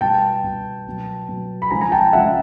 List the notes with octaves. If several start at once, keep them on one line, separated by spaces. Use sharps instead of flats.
B2 G3 G5 A5
B2 G3
B2 F#3
B2 F#3
B5
C#3 F3 G#3 G#5 A#5
G#5 A#5
G5 A5
C#3 F3 G#3 E5 F#5